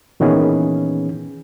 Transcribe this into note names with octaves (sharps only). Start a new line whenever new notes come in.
A#2 D#3 E3 B3 C#4 G#4